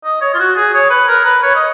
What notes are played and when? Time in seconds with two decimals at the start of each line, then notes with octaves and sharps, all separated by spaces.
0.04 D#5
0.21 C#5
0.34 F4
0.39 F#4
0.56 G#4
0.74 C#5
0.90 B4
1.08 A#4
1.25 B4
1.42 C#5
1.55 D#5